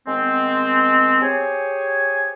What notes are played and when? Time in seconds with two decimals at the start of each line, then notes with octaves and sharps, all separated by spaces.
0.06 D#3 G#3 B3 C4
1.21 G4 G#4 C5 C#5 G#5